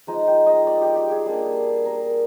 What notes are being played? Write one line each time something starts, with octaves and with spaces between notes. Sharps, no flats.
F3 G#3 D#4 A#5
G5
D#5
D5
G4
G4
G#4
G3 A#3 D4
A#4